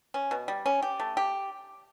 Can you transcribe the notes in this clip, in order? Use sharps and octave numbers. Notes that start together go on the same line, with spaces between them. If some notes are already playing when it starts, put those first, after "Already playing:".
C#4
B2
G3
C#4
G4
A3
G4